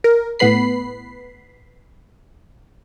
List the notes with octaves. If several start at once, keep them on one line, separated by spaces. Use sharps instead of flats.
A#4
A2 B3 B4 B5 C7